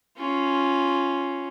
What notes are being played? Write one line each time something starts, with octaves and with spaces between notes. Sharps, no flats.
C#4 F4